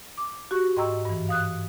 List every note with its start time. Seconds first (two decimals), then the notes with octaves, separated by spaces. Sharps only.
0.18 D6
0.51 F#4 G4 C#6
0.77 G#2 D#5 G5 A#5 C#6 E6
1.05 G2 E3
1.29 F5 D#6 F#6